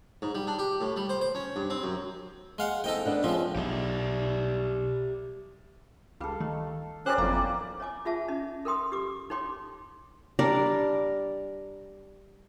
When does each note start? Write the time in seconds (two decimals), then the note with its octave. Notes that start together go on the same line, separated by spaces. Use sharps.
0.22 G#2
0.35 G3
0.47 D4
0.59 G4
0.81 A2
0.96 G3
1.09 C5
1.21 C5
1.35 C#4
1.56 G2
1.70 C4
1.84 F#2
2.58 G#3 F5 F#5
2.84 E2 C4 A4 D#5 G5
3.05 B3 D4 F#5
3.24 F3 G#3 C4 C#5
3.56 B1 G4 D5 E5
6.20 C#2 G3 A4 F5
6.41 D#3 A3
7.06 C#4 G4 A#4 C5 D5 F#6
7.18 G1 F2 F#3 A#3 E4 A#5
7.80 C#5 D#5 G#5 D6
8.05 F4 G#4 E5 F#5 A5
8.28 C#4 D#4 D#5
8.65 A4 A#4 G5 C6 D#6
8.92 G4 D6
9.30 D#4 A4 C#5 G5 C6 D6
10.39 G3 D4 A#4 D5